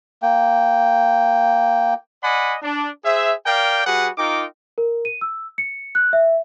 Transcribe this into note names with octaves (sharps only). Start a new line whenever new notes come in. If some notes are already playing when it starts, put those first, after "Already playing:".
A#3 G5
D5 D#5 F#5 G#5 B5
D4
G#4 C5 E5
A#4 D5 F5 G5
G3 F#4 G#4 B4 F#5
D#4 F4 A#4 G5 D6
A#4
D#7
E6
C#7
F#6
E5